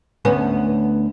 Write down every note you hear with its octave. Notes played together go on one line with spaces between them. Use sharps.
D2 B3 C#4